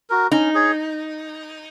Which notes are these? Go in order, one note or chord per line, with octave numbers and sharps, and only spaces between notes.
F#4 A#4
C#4 D#4
G#4 C#5